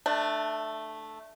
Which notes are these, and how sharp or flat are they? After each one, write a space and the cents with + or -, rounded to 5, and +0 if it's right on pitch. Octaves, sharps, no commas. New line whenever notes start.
A3 +0 D4 +25